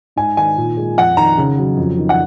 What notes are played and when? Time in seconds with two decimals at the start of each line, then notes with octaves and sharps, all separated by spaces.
0.16 G#2 G#5
0.37 D#3 G#5
0.57 A#2
0.77 G#3
0.97 F2 F#5
1.17 D#3 A#5
1.38 C#3
1.58 F#3
1.77 F2
1.98 D#3
2.09 F#5